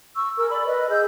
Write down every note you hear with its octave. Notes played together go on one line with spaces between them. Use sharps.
C#6 E6
G#4 A#4 E6
D5 B5
B4 D#5
G#4 D#5 E6 G6